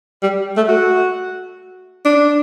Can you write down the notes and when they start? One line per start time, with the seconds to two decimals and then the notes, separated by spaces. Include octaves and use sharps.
0.23 G3
0.57 A3
0.68 F#4
2.05 D4